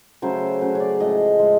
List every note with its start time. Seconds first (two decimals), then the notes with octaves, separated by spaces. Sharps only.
0.22 C#3 F#3 A3 C5
0.61 C#3 F#3 A3
0.75 C#5 D5
1.00 A2 F3 G#3 D#5
1.39 A2 F3 G#3